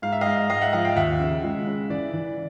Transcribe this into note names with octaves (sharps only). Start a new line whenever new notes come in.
G#2 F5
E5
G#2 D#5 F5
G#2 D#5 F5
E5 F#5
F3 D#5 F5
F5 G5
D#2 E5 F#5
C#3
G#3
C#3
E3 D5
E3